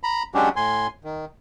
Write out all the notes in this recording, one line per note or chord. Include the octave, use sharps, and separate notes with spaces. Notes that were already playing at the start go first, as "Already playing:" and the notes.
A#5 B5
F#3 G#3 C#4 D4 F#4 G4
A2 G#5 C6
D#3